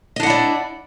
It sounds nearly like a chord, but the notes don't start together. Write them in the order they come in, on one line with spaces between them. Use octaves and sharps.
D#5 D4 F#5 E4 D5